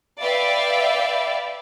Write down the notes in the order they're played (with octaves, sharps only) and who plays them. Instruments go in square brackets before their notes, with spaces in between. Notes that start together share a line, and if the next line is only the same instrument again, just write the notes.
[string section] B4 D5 E5 F5 G5